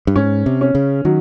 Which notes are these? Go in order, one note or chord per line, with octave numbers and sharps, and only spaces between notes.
G2
G#2 C#4
C3
C#4
C#3
D#3 F#3